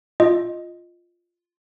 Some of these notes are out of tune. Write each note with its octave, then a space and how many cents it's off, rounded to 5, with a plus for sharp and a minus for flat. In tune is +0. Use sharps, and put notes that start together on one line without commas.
F4 +0 D#5 +0